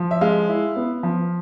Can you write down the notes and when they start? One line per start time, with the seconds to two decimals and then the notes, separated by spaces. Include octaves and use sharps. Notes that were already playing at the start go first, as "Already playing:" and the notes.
Already playing: F3
0.11 E5
0.21 G#3 F5
0.49 E4
0.76 B3
1.03 F3